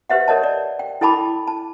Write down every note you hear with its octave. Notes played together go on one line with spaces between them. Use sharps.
G4 B4 C5 E5 F#5
A#4 C#5 D#5 A5
D5
G5
E4 A4 G5 A5 B5 D6
A5